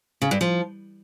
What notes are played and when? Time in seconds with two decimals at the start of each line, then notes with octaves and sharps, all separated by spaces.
0.22 C#3
0.31 G2
0.41 F3